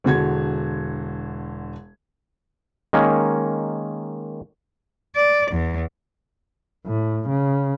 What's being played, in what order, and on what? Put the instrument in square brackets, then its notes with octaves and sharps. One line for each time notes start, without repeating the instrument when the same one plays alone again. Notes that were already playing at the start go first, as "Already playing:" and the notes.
[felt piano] E1 D3 F#4 G#6
[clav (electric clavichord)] D#3 G#3 A#3 C#4
[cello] D5
E2
[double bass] A2
C#3